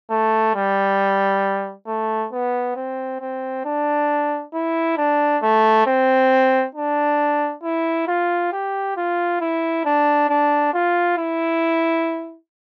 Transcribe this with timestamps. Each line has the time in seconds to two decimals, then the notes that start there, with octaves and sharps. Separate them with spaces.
0.11 A3
0.55 G3
1.87 A3
2.32 B3
2.76 C4
3.21 C4
3.65 D4
4.53 E4
4.97 D4
5.43 A3
5.87 C4
6.75 D4
7.63 E4
8.08 F4
8.52 G4
8.97 F4
9.40 E4
9.85 D4
10.29 D4
10.73 F4
11.18 E4